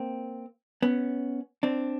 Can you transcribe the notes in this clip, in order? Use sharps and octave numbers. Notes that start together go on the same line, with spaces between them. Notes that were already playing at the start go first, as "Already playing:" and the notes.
Already playing: A#3 C4
B3 C#4
C4 D4